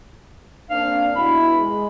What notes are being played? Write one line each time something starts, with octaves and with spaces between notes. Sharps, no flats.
A#3 C4 D4 F5
G2 B2 E4 B5
G#3